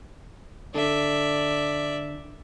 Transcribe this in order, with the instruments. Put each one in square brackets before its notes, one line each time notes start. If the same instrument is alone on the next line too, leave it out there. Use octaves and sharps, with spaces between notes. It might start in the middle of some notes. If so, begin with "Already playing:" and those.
[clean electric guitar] D3 [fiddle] D5 E5